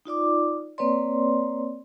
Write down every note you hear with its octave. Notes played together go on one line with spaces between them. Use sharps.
D#4 F4 D5 D6
A#3 C4 B4 C#5 D5 C6